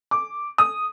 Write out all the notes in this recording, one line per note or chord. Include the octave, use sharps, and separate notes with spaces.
D6
D#6